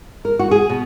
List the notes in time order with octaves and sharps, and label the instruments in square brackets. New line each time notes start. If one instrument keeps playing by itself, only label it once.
[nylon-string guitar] A#4
F#4
G#4
B2